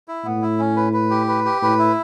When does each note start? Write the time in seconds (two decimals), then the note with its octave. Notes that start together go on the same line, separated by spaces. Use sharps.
0.08 E4
0.25 A2 B3
0.42 E4
0.59 C#4
0.77 B4
0.93 B4
1.10 G4
1.28 B4
1.45 G4
1.62 A2 B4
1.79 E4